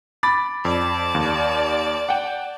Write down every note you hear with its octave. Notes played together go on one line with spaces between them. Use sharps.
B5 D6 A6
F2 D5 A5
D#2
F#5 G5